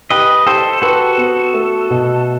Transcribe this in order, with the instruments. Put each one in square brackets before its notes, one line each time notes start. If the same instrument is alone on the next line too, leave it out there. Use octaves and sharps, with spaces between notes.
[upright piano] G4 [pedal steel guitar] B4 D#5
[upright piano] G4 [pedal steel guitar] A4 C5
[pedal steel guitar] F#4 A4 [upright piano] B4
[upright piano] B3
A3
B2